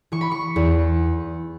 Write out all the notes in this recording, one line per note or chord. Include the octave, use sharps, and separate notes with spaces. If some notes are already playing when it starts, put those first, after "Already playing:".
E3 C#6
B5
C#6
E2